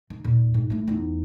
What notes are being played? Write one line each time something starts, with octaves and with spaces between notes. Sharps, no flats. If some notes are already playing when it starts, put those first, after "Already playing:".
D#3
D#2 A#2
G#2
A3 E4
E2 D#4